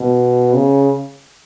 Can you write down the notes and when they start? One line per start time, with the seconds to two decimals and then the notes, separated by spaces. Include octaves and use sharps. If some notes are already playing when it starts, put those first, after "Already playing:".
Already playing: B2
0.54 C#3